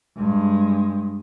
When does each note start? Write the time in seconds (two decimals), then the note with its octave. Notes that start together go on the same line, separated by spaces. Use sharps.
0.17 G2 G#3